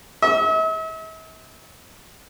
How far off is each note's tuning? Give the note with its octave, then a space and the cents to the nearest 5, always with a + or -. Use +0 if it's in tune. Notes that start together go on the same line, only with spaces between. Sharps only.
E5 -45